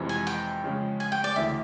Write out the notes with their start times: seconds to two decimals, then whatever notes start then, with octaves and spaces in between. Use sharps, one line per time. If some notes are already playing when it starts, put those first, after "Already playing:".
Already playing: F2 C3 E3 G#3 C4
0.09 G#5
0.27 G5
0.64 C#3 F3 G#3 C#4
1.00 G#5
1.12 G5
1.24 D5
1.36 D2 C#3 E3 E5